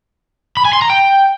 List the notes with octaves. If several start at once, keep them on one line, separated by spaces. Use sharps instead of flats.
B5
G#5
C6
A#5
G5